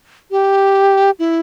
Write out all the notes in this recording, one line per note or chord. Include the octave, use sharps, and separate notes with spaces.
G4
E4